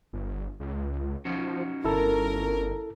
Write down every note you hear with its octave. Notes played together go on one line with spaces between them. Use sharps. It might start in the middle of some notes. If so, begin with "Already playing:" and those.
G1
C#2
F3 C#4 D#4 F#4
G1 E4 A4 A#4